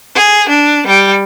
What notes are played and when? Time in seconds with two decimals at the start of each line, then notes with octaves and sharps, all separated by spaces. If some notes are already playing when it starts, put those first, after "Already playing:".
0.15 G#4
0.48 D4
0.86 G3